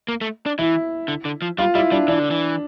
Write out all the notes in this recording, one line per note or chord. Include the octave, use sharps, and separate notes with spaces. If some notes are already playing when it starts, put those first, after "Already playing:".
A#3
A3
D4
E3 E4
D3
D3
F3
G3 F4
G3 E4
G3 D4
E3 D4
D3
E3